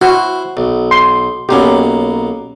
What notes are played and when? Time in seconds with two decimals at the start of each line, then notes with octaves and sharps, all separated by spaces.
0.01 E4 F#4 C5 C6
0.57 B1
0.91 C6
1.49 B1 A#3 B3 C#4 G4